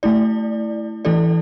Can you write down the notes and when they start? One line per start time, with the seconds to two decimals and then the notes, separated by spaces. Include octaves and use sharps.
0.03 A3 E4 D5
1.05 E3 A3 E4 A4 D5